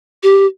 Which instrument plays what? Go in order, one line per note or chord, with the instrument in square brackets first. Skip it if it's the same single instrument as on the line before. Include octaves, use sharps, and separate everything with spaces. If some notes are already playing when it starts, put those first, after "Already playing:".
[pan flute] G4